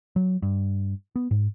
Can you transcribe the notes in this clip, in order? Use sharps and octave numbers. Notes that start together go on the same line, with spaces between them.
F#3
G2
B3
G#2